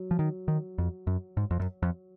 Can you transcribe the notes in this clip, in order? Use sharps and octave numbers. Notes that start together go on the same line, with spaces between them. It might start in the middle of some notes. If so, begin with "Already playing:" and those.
Already playing: F#3
F3
D#3
D#3
F2
F#2
G#2
F2
F#2
F2